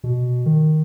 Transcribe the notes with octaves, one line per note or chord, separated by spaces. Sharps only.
B2
D#3